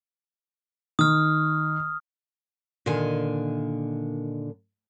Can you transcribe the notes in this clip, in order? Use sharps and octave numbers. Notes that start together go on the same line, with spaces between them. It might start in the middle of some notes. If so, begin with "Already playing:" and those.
D#3 D#6 F6
A#2 D3 D#3 D#5 G#5